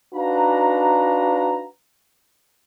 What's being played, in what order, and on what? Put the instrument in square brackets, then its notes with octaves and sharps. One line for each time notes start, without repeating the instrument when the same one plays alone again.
[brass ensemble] D4 D#4 F#4 B4 F5 A#5